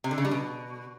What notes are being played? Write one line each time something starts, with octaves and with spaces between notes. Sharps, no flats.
C3
D3
C#3
G3
B2